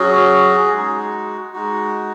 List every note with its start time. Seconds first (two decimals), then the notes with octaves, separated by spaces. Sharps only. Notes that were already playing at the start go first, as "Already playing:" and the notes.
Already playing: F#3 C#4 F#4 G#4
0.72 G#3 D#4 F#4
1.53 G#3 D#4 F#4